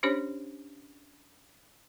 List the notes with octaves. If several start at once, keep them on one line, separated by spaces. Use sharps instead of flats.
C#4 D4 G4 C5 C#5